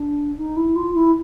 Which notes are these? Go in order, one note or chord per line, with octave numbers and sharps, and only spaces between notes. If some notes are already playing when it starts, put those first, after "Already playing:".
Already playing: D4
D#4
E4
F4
E4